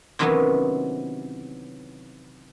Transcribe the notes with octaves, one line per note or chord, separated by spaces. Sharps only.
C3 D#3 E3 F#3 B3 C#4